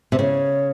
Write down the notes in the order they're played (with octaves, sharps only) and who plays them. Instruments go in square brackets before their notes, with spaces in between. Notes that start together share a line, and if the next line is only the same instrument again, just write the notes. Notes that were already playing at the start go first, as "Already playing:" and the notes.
[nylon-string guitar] C3
[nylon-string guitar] C#3 [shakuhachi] C#5